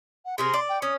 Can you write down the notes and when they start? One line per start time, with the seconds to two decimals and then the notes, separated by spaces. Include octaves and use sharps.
0.25 F#5
0.38 C3 G#4 A#4 C6
0.54 D5
0.69 G5
0.82 C#4 D#6